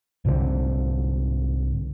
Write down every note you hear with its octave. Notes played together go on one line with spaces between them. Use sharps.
C2 G#2 D3 C4